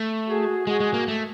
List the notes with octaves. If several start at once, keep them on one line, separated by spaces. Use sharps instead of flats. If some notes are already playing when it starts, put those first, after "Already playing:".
Already playing: A3
F#4 G#4
G#3 F#4 G#4
G#3
A#3
A3